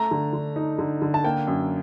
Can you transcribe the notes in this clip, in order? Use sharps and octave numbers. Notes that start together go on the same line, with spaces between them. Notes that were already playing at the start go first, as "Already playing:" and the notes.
Already playing: A3 A#5
D3
D3
D#4
D3
D3
A5
A#3 G5
F#2